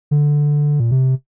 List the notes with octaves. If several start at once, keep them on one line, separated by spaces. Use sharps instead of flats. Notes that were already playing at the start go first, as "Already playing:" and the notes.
D3
A#2
C3